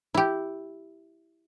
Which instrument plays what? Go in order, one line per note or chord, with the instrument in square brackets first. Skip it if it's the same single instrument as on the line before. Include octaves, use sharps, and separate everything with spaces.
[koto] E4 G4